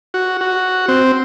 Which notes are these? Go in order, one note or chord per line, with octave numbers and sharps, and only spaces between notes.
F#4
F#4
C4